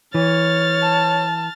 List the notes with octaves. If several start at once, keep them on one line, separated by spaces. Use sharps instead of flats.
E3 C#5 F6 A6
A5